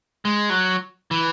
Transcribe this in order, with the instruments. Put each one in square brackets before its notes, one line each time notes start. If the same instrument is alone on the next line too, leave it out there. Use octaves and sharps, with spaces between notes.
[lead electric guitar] G#3
F#3
E3